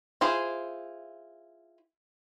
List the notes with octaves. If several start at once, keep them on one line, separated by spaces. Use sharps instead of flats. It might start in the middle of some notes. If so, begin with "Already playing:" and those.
E4 F4 G#4 C5